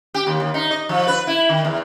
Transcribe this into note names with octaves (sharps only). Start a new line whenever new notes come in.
G4
D#2
D#2
D#4
D#5
F3
B4
E4
D#3
E2